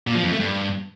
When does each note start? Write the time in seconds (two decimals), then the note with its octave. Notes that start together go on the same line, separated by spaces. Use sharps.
0.07 A#2
0.15 F3
0.23 F2
0.31 A3
0.40 G2